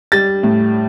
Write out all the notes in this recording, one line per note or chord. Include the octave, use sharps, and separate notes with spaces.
G3 A6
A2